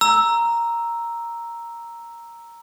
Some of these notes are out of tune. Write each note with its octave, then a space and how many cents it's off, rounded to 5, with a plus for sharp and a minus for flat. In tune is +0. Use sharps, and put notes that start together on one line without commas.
A#5 +0 E6 +0